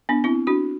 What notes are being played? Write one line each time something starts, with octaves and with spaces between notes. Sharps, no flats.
B3 D4
C4 E4
D4 F#4